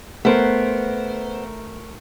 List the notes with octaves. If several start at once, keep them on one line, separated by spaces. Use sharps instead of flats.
A3 B3 A#4 C5